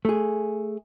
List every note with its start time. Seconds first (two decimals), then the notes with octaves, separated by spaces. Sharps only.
0.05 A3 G#4